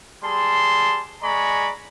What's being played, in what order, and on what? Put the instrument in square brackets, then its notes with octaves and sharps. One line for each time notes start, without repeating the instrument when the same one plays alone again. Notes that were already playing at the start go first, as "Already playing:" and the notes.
[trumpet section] G3 G#4 A5 C6
G#3 D5 G#5 A#5 B5 C#6